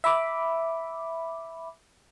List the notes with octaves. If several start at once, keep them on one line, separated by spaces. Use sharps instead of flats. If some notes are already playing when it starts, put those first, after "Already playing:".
E5 B5 D6